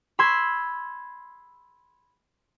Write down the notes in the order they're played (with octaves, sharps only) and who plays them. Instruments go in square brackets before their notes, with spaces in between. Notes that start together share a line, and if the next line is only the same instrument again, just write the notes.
[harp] B5 C6 E6 G#6